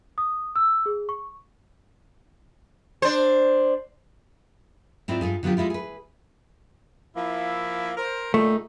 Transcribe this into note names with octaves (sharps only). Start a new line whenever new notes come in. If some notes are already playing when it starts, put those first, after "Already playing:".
D#6
E6
G#4
C#6
D4 C5
G#2 C4 E4 F4 C5 D5
G2 F4 G#4
D3 F#3 B3 F4 G4
G3 G#3 E4 F4
G#4 B4
F3 A#3 E4
A#4 C5
A#2 D3 A3 D#4